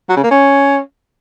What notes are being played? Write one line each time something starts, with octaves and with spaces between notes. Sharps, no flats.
F#3
C#3
A#3
C#4